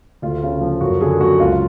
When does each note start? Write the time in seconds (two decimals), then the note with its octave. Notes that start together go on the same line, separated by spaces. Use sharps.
0.22 D2 F4
0.43 C#3
0.61 F3
0.81 F#2 F#4
1.01 D3 G#4
1.20 F#3 F#4
1.40 C#2 F4